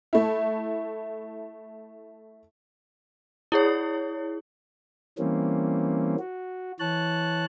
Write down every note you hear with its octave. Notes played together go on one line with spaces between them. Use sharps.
A3 E4
E4 G#4 C#5
E3 G3 A#3 C4 C#4
F#4
E3 C#5 A5 F#6